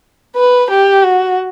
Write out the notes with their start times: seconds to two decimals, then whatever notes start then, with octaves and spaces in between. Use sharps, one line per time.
0.36 B4
0.70 G4
1.04 F#4